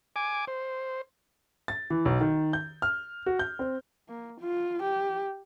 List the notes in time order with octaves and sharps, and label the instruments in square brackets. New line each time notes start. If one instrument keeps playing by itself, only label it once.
[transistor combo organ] G#5 D6
C5
[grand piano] A6
E3
B1
D#3
G6
F6
F#4
G6
C4
[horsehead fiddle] A#3
F4
G4